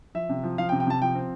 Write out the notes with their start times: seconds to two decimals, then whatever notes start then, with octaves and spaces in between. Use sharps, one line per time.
0.15 F3 E5
0.29 C3
0.43 F3
0.58 F3 F5
0.69 G5
0.72 C3
0.80 G5
0.87 C3 A5
1.02 F3 G5
1.15 C4